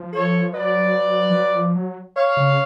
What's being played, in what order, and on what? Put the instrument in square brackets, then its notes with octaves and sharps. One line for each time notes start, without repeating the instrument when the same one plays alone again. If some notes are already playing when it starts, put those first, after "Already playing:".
Already playing: [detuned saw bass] F3
[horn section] A4 C#5
[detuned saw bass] F#3 [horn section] B4 D5
[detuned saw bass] F3
F#3
F3
F#3
[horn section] C#5 F5
[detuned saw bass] C#3